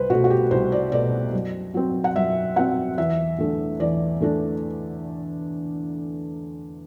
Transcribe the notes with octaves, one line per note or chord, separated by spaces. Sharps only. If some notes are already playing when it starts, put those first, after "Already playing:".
Already playing: C2 B4 C5
B2 A3 F#4
F#4
G4
C2 C5
D5
B2 A3 D5
F#2
F#3 C4
F#5
F#2 E5
F#3 C4 F#5
E2 E5
D3 A3 D4
E2 D5
D3 A3 D4